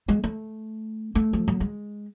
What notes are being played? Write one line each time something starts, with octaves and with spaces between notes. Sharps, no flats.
G#3
A3
A3
F3
F#3
G#3